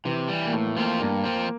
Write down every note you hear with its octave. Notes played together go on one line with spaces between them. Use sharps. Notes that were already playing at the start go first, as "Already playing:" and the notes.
C3 E3
E3 G3
A#3
A2 A3
A3
F3 A#3 C4 F4
G2 A#3
F3 C4